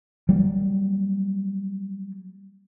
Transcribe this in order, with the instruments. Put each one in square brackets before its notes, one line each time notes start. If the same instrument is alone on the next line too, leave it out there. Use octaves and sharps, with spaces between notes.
[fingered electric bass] F#3 G3 A#3